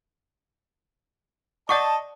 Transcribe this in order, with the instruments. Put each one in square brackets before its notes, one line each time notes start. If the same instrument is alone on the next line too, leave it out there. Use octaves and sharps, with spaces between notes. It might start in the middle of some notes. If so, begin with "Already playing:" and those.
[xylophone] D5 F#5 D6 [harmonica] D#5 [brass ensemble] A5 [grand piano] C#6